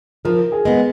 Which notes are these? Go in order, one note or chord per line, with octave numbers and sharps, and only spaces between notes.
F3 A#4
G#4
G#3 B3